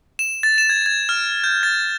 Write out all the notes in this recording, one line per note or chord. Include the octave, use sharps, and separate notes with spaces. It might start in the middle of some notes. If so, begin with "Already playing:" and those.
E7
A6
E7
G#6
G#6
F6
G6
A6